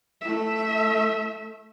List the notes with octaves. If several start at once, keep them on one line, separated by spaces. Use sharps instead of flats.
A3 E5